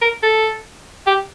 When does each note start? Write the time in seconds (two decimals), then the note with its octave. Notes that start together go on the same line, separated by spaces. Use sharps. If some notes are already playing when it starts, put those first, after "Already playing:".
0.02 A#4
0.23 A4
1.07 G4